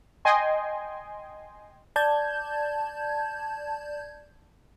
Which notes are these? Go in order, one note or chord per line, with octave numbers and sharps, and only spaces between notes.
D#5 G5 G#5 C6
D5 A5 G6 G#6